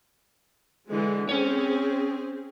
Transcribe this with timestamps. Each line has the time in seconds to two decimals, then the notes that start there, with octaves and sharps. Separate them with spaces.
0.89 D3 E3 G#3
1.29 C4 C#4 G#4 C#5